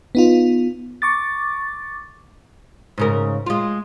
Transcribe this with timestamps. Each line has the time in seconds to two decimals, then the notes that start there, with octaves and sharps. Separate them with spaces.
0.15 B3 D#4 F4
1.02 C#6 D6 A6
2.98 G#2 C#3 A#4
3.46 G#3 F4